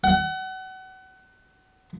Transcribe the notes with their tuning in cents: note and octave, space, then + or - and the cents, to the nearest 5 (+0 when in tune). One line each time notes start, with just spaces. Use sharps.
F#5 +30